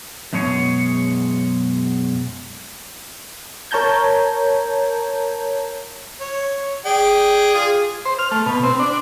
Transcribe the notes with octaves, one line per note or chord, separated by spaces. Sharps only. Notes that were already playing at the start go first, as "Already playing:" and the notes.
F#2 B2 G#3 G#4 C#5
A#4 C#5 A5 A#5 G6 G#6
C#5
G#4 D5 G5
F4 G#4
C5
F6
A3
B2
C4
D4